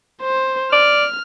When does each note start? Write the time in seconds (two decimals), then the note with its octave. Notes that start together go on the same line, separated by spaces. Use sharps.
0.22 C5
0.72 D5 F6